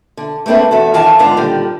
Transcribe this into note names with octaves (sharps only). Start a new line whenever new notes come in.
D3
A3 A#3 C4 D4 B4
E2 F#4 A4
F#2 D#3 E3 F5 G#5 A5
G#2 D3 B3 D4 F4 F5
A#2 D3 D#3 G3